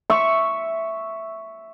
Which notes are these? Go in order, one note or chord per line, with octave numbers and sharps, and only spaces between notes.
E5 C#6